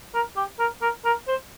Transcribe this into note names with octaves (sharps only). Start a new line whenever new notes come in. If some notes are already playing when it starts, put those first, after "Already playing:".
A#4
G4
A#4
A#4
A#4
C5